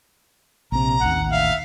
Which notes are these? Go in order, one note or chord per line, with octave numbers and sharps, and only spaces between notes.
A#1 C3 A#5
A1 D#2 F#5
E5 F5